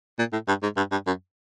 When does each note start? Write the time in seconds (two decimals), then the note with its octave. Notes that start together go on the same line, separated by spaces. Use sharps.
0.19 A#2
0.32 A2
0.48 G2
0.63 G#2
0.77 G2
0.92 G2
1.07 F#2